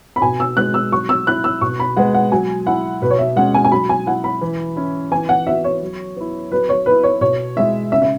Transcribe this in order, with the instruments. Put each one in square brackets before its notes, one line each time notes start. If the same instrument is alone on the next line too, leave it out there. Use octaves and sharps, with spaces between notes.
[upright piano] B5
[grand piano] B2 [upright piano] G#5
[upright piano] E6
[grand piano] G#3 B3 F#4 [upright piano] F#6
[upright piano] E6
[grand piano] F#3 [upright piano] C#6
[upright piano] E6
[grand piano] E4 [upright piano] F#6
[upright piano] E6
[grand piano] B2 [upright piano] C#6
[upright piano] B5
[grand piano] G#3 B3 [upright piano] F#5
[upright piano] F#5
[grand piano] F#3 [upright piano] G#5
[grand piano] E4 [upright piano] F#5
[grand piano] B2 [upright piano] B4
[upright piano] C#5
E5
[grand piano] G#3 C#4 [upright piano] F#5
[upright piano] G#5
G#5
[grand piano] F#3 [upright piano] B5
[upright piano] G#5
[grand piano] E4 [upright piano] F#5
[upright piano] B5
[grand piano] E3
C#4 E4
[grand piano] E3 [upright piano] G#5
[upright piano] F#5
[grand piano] B3 F#4 [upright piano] E5
[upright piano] C#5
[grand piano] F#3
B3 E4
[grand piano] F#3 [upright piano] B4
[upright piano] C#5
[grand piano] B3 E4 [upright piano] B4
[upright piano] C#5
[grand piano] B2 [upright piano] C#5
[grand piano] G#3 E4 [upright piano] E5
[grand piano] C#3 [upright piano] E5
[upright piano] E5